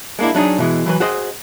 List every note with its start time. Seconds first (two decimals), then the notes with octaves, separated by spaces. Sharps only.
0.19 G#3 A#3 D4 E4
0.35 F#3 D4 D#4 G#4
0.58 B2 E3 G#3
0.86 E3 F#3 B4
1.00 F#4 G#4 C5 D#5